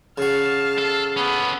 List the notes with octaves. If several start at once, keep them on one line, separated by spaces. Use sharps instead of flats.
C#3 F#4 F5 A5
A4
B3 C#4 A4